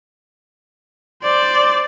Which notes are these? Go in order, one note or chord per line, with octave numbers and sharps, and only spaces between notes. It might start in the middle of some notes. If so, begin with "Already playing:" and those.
C5 D5